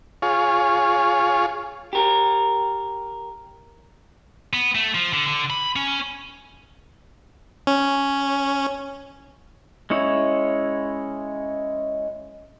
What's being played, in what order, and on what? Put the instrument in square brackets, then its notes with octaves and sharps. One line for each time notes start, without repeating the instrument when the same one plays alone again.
[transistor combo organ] F4 G#4 C#5
[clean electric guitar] G4 A#4
[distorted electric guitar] B3
A3
F3
D3
D3
B5
C#4
[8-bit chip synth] C#4
[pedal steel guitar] G#3 C#4 E4 C#5